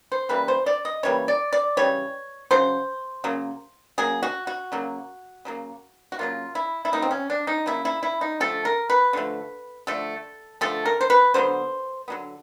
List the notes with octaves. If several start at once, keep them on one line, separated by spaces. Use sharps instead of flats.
C5
C#3 E3 G3 A#3 B4
C5
D5
D#5
C#3 E3 G3 A#3 C#5
D5
D5
C#3 E3 G3 C#5
C#3 F#3 C5
C#3 F#3 A#3
C#3 F#3 A#3 G#4
F#4
F#4
C#3 F#3 A#3
C#3 F#3 A#3
F#4
C#3 F#3 A#3 F4
E4
E4
C#3 F#3 A#3 D#4
C4
C#4
D4
D#4
C#3 F#3 A#3 E4
E4
E4
D#4
D3 F3 A3 A4
A#4
B4
D3 F3 A3
D3 F3 A3 A4
D3 F3 A3 A4
A#4
C5
B4
D3 F#3 B3 C5
D3 F#3 B3